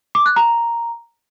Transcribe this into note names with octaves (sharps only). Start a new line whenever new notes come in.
D6
F#6
A#5